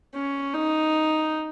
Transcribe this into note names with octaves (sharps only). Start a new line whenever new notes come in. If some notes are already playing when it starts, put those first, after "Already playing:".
C#4
D#4